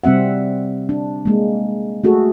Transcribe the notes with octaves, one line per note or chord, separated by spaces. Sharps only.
C3 G3 C4 E5 F#5
D4
G#3 A#3
A3 F#4 G#4 A4